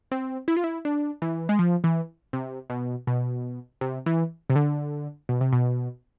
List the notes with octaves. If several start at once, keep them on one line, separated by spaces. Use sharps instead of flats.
C4
E4
F4
E4
D4
E3
G#3
F3
E3
C3
B2
B2
C3
E3
C3
D3
B2
C3
B2